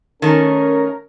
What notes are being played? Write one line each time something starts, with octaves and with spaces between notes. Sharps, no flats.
D#3 A3 C#4 A#4